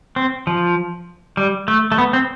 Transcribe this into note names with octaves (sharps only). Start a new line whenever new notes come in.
C4
F3
G3
A3
A3
B3
C4